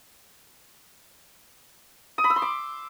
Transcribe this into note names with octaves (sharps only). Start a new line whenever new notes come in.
D#6
B5
E6
C6
D6